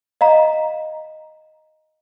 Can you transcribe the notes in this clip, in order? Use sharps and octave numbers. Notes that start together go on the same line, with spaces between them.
D#5 F5 A#5